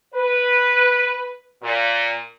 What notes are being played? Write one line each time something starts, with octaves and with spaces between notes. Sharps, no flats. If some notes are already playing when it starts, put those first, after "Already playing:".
B4
A#2